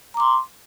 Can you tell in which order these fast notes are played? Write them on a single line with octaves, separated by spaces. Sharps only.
A#5 D6 C6